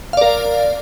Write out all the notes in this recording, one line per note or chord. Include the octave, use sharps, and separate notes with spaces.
A#4 D5 F5